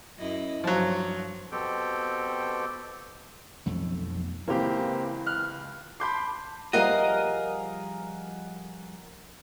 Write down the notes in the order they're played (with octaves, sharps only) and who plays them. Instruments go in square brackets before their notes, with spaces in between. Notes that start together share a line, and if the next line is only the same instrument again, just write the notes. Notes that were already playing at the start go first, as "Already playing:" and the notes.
[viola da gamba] F#2 E4 D#5
[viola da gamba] G2 [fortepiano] F3 F#3
[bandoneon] B2 C4 G4 A4 G5
[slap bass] B1 F2 F3 A3
[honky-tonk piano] C#2 E3 [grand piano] A#3 C4 G4
[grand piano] F6 F#6
[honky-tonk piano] A5 G6 C7 [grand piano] B5 C6 D6
[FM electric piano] F3 G3 [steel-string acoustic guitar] G#4 A#4 F5 [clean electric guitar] D#5 [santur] F#5 A#5